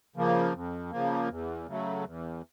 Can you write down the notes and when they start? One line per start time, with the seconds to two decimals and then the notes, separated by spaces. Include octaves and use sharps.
0.16 C#3 F3 A#3
0.53 F2
0.91 C#3 F3 A#3
1.29 E2
1.67 C#3 F#3 A3
2.04 E2